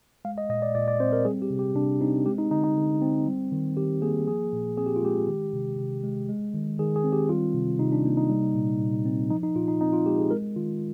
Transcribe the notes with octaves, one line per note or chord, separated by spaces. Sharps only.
G#3 F5
D#5
A#2 D#5
D5
A#2 D5
D5
C4 C5
A#4
G3 G#4
G4
C3
G4
C3 D4
C4 D#4
G#3 G4
D#4
D3 D#4
D#4
D3
C4
G3
D#3
D#3 G4
A#3 G#4
F3 G#4
A#2
C4 G#4
G4
F4
G#3 G4
D#3
C3
C3
G#3
G#3
D#3
D#3 G#4
G#4
C4
G4
G3 F4
C3
C3 D#4
D4
A#3
D#4
G3
A#2
A#2
C4
F3 D#4
D#4
A#2 F4
D#4
C4 D#4
F4
G#3 G4
G#4
G#3 A#4
D#3 F4